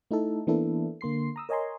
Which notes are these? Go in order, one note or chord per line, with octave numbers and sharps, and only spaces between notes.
A3 D#4 E4 A4
E3 A#3 B3 D4 E4 A4
D3 A#3 C6 C7
A#5 D#6 E6
A#4 C#5 D#5 G#5 A#5 C6